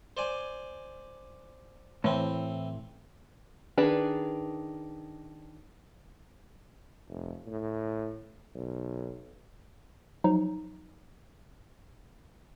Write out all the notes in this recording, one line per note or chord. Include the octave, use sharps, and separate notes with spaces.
C5 D5 G#5
A2 E3 C4
D#3 D4 G#4 B4
F1
A2
B1
F3 F#3 D#4